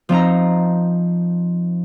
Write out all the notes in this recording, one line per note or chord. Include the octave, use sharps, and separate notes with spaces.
F3 C4 D#4 A#5